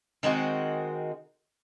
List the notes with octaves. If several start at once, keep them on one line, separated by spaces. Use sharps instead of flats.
D#3 G#3 C4 F#4